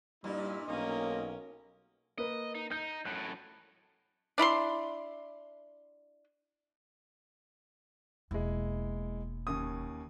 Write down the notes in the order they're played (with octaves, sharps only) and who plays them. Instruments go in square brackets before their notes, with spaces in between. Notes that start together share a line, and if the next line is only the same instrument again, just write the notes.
[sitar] G2 A#2 D#4 [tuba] G3 [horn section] A#3 E4
[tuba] B1 [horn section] A#3 D#5 [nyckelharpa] C#4 A#4
[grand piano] A#3 B4 [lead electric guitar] D#5
[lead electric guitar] D#4
[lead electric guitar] D#4 [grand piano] G6
[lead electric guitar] F#2 A2 [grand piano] F#6
[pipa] D4 E4 B5 C6
[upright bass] E1 A#3 [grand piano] G#3 E4
[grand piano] D#2 C#4 D#6